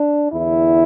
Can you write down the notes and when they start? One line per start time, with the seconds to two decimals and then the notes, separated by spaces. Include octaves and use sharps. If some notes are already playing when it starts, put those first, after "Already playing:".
Already playing: D4
0.32 E2 D3 E4